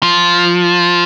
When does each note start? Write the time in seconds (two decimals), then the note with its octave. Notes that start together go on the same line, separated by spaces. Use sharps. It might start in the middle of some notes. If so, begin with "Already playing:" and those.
0.03 F3